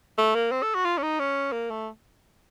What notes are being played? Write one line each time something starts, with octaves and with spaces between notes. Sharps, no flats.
A3
A#3
C4
A4
F#4
F4
C#4
D#4
C#4
A#3
A3